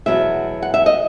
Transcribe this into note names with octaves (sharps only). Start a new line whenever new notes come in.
E2 B2 F#3 E5
F#5
E5
D#5